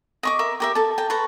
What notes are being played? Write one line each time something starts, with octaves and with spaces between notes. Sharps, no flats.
D#5 C#6 D6
A#4 E5
G4 A#4 E5
A4 A5
G5 A5
A4 B4 A#5 C#6